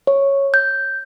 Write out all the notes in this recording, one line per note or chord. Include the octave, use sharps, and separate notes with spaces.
C#5
G6